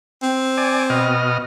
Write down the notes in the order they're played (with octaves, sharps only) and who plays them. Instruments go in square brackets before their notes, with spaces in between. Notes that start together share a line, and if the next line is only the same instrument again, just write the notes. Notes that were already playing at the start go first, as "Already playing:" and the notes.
[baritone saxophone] C4
[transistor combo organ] D5 G#5
B2 D#5 F6